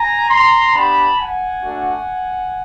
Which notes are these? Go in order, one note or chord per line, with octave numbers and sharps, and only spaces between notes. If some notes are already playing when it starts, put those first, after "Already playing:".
Already playing: G#5 A#5
A#5 C6
B3 D4 G4 A5 B5
F#5 G#5
A3 D4 F#4